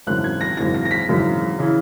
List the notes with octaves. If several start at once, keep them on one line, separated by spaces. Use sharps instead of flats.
G#1 F#2 C#3 E3 F#6
G#6
A#6
G#1 F#2 C#3 E3 A#6
A#6
A#6
B6
G#1 F#2 C#3 E3
C#3 E3